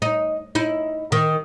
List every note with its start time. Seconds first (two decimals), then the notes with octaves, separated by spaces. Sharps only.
0.02 D#4
0.55 D#4 E4
1.12 D#3